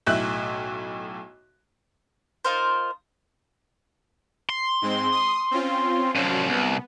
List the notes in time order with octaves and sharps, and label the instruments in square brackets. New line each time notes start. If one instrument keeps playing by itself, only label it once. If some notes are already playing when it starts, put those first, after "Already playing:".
[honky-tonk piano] B1 A2 E5 F#6
[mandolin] D#4 F4 A#4 C5
[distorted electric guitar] C6
[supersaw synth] G#2 G#3 C4
D#6
C4 C#4 F4
[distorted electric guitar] C2 F3 [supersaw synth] F#3 C#4
[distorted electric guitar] C2 [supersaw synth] B3